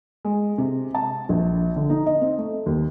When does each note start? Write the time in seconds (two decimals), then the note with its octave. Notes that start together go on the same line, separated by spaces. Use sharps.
0.25 G#3
0.58 C3
0.95 A5
1.29 A#1
1.76 D3
1.90 D#4
2.06 D#5
2.21 C4
2.38 A3
2.66 D#2